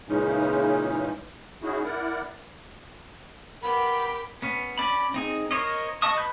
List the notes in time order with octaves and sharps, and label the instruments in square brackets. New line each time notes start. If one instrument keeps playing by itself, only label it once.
[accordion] A#2 C#3 E3 G#3 C#4 D#4
C#4 D#4 E4 F#4 G#4
E4 A#4 D5 F#5
[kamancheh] B3 [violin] G4 B6 [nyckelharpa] A#4 [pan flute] B5
[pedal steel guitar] B3 C#4
C#4 D5 B5
C4 D#4 G#4
A#4 C5 C#5 D#5
D#5 A5 C#6 D#6
B4 B5 G6